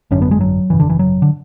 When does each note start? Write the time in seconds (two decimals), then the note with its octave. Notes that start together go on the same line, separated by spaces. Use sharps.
0.11 G#1 F#2 D3 C#4
0.22 B3
0.31 G#3
0.41 F#3
0.70 G#1 F#2 C#3 E3
0.80 D3
0.90 E3
0.99 F#3
1.22 D3